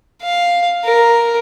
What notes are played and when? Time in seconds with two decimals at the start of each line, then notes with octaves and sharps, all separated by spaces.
0.22 F5
0.85 A#4